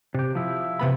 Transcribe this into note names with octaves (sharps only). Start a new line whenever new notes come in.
C3 G4
F3 E4
C3 B3 B5